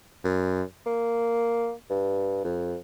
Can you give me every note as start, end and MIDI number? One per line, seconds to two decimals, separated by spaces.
0.24 0.62 42
0.86 1.72 58
1.90 2.42 43
2.44 2.76 41